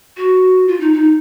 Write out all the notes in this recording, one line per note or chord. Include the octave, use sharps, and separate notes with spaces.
F#4
F4
D#4
D#4